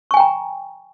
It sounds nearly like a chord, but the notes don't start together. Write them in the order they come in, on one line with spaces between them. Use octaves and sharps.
C#6 G#5 G5 A#5